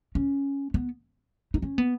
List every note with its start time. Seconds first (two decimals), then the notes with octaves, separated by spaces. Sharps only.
0.15 C#4
0.74 B3
1.54 D#4
1.62 C#4
1.78 B3